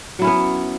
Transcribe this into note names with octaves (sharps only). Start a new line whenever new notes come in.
F#3 B3 C#4 E4